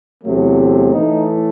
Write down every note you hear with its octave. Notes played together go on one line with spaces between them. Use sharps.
E2 C3 F#3 A3
A2 E3 A3 D#4